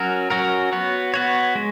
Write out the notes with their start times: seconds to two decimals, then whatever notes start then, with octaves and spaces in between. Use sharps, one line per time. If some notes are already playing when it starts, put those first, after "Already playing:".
Already playing: F#3 C#4 F#4 A#4
0.30 F#3 C#4 F#4 A#4
0.72 B3 F#4 C#5
1.14 B3 F#4 C#5
1.55 G#3